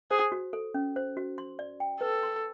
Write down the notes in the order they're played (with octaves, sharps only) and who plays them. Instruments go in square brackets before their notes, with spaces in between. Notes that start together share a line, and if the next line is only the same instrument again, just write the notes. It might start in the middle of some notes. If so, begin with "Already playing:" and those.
[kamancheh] G#4 [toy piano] C5
[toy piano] F#4
A4
C#4
C5
F#4
C6
D5
G5
[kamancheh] A4 [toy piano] B4
[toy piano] C6